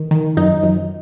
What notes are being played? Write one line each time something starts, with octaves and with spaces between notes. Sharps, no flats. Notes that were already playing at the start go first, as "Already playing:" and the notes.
Already playing: D#3
D#3
F#2 D#4
F#2